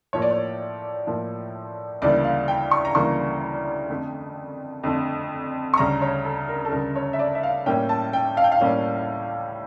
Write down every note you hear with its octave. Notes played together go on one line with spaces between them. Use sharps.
A2 F3 A#3 C#5
D5
C#5
A2 F3 A#3
D2 C#3 E3 G3 A#3 D5
F5
G5
C#6
A#5
D2 C#3 E3 G3 A#3 C#6
F2 D3 A3
F2 D3 A3
C#6
D2 C#3 G3 A#5
C#5
A4
A#4
A4
D2 C#3 G3 A#4
C#5
E5
D5
E5
F5
A2 G3 A#3 C#4 G5
A5
G5
F5
G5
F5
A2 G3 A#3 C#4